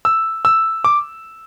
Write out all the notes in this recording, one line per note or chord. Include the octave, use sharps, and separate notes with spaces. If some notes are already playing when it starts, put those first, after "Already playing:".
E6
E6
D6